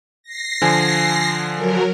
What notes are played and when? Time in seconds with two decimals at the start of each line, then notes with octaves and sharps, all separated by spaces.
0.23 A#6 C7
0.62 D3 F3 G#5
1.55 F#3 A#4